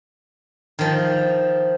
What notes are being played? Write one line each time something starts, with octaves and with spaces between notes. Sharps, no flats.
D#3 F3